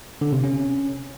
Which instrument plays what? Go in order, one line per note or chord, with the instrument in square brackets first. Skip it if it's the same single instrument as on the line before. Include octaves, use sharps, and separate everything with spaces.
[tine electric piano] D3
C3
C#4